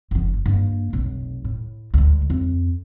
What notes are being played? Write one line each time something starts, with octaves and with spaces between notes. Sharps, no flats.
F#1 F3
G2 A#3
F1 B1
A2
D2 G#3
F2